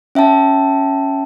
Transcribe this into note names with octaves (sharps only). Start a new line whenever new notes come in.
C#4 E5 G5 A5